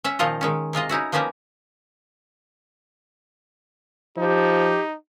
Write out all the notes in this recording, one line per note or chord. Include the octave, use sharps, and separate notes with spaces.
C#4 E5 F#5
A#2 D#3 F3 F4 C#5 D#5
D#3 G#3 C#4
C3 G#3 F4 D#5
C#4 D#4 E4 F#4
F3 A#3 B3 C#4 F#4 G4
F3 D#4 G4